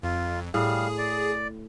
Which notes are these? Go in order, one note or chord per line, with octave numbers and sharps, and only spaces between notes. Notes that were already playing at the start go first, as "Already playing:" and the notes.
F2 F4
A2 G3 G#4 F5
D5